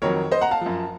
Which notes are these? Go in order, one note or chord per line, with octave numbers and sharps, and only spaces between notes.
F2 D#3 F#3 A#4 C#5
C5 D#5
F#5 A#5
F5 A5
F#2 F3